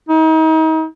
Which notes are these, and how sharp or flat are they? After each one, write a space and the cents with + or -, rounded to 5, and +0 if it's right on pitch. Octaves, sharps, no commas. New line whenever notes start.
D#4 +35